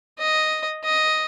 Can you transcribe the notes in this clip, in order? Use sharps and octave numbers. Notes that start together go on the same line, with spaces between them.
D#5
D#5